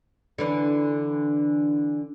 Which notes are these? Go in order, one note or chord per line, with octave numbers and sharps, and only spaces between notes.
D3 E3 D4